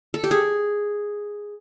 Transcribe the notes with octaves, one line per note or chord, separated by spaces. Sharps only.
A4
G4
G#4